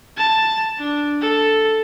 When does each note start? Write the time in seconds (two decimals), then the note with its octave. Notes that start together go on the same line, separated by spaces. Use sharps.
0.17 A5
0.78 D4
1.21 A4